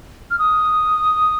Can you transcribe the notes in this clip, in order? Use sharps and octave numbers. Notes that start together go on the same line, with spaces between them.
F6
D#6